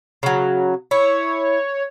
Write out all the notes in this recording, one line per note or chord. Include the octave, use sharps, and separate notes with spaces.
C#3 F#3
E4 C#5